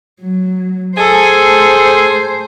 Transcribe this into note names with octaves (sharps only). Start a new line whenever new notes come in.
F#3
G#4 A4 C5